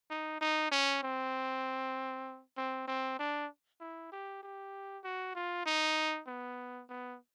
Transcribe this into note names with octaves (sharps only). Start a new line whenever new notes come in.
D#4
D#4
C#4
C4
C4
C4
D4
E4
G4
G4
F#4
F4
D#4
B3
B3